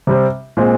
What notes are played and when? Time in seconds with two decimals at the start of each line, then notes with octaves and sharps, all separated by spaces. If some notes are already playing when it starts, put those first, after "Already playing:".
0.07 C3 G3 C4
0.57 A#2 G#3 C4